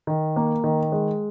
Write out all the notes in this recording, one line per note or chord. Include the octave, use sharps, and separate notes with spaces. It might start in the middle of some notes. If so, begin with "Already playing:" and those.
D#3
A#3
D#3
G#3